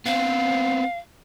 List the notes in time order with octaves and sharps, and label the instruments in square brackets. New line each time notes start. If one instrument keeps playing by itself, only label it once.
[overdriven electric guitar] B3 C4 [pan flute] F5